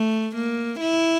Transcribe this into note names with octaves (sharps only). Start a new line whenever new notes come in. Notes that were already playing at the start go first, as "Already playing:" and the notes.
Already playing: A3
A#3
E4